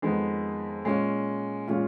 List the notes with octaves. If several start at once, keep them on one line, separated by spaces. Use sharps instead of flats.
F2 D#3 G#3 B3
A#2 G#3 C#4 F4
A#2 G#3 C#4 F4